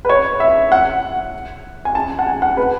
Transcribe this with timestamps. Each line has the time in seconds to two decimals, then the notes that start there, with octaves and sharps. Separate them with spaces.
0.05 B4
0.09 C#5
0.40 E5
0.72 F#5
1.85 G#5
1.95 A5
2.19 F#5
2.27 G#5
2.42 F#5
2.57 B4